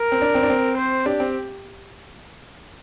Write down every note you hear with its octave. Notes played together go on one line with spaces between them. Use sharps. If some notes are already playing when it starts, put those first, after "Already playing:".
Already playing: A#4
C4
D4
C4
D4
C4
C5
D4 G4
C4